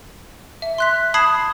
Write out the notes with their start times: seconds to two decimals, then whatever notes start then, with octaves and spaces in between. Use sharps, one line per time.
0.62 E5
0.78 C6 F#6 B6
1.14 A5 B5 D#6 G#6 C7 E7